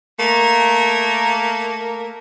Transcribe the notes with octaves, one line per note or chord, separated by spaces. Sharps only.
A3 A#3